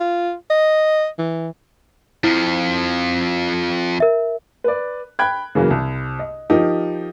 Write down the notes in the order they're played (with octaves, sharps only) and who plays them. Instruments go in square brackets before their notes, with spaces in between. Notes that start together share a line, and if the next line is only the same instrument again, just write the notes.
[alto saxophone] F4
D#5
E3
[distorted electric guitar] F2 F3 [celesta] E4
[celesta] A#4 E5
[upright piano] B4 D5
G5 B5 F#6 G#6
C#3 E3 F#3 A#3
C2
D#5
F3 D#4 G4 A#4